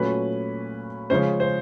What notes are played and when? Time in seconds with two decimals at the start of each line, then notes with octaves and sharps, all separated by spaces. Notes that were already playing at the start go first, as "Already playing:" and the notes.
Already playing: A#2 F#3 A3 C#4 B4
1.10 C#3 F3 G#3 C#4 C5
1.40 C5